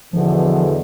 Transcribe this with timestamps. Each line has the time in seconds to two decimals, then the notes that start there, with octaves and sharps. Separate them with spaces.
0.13 E2 B2 D3 F3